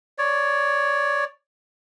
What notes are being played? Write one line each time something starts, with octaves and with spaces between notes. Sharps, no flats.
C#5 D5